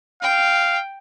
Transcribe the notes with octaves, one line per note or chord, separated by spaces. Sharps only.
F5 G5